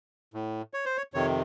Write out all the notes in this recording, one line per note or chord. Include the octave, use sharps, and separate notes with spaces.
A2
C#5
C5
C#5
F2 C3 D#3 C#5